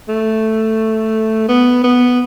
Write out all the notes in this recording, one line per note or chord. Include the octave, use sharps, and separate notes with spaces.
A3
B3
B3